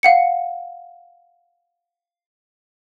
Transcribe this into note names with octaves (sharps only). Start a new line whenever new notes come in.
F5 F#5 C#7